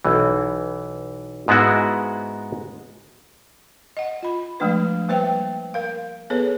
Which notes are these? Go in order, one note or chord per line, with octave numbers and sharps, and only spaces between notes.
B1 E3
G#2 G#3 B3 E4 F#4
D#5 F#5
F4 B5
F3 G#3 A3 D4 B4
G3 A#3 B4 C5 E5 G5
A#4 F5
B3 G#4 A4 B4 C#5